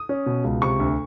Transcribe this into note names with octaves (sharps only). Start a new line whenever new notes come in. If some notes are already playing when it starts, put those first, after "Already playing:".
Already playing: D#6
C#4
B2
C#2
C3 C#6
D2